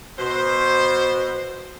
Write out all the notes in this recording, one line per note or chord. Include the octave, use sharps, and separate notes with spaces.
B2 C5